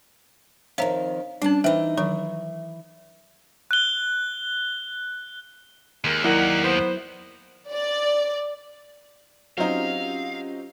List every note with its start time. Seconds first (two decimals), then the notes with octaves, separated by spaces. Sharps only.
0.78 F2 D#3 C#5 E5 F5 A#5
1.42 G3 C#4 D4 A5
1.64 E3 D#4 B4 C5 E5 G5
1.98 D#3 E3 F#3 C#6
3.71 F#6 G7
6.05 D#2 G#3 A#3 A#4
6.24 F#3 D#4 E4 A#4 D5 F#5
6.62 B3 C5
7.72 D5
9.58 F#3 C4 C#4 D#4 F4 G4 F5